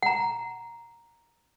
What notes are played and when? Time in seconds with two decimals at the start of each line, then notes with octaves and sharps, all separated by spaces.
0.03 F#5 A#5